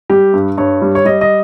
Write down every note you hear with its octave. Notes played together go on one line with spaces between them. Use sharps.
G3 G4
G2
G2 C#5
G3
C#5
G3 D#5
D#5